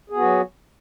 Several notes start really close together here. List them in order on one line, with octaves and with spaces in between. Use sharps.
G#4 B3 F#4 F#3